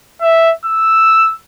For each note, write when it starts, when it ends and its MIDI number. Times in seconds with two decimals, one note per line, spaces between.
0.21 0.52 76
0.66 1.34 88